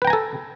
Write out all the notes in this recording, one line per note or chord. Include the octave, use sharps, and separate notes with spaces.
A4 B4 G5 G#5 A#5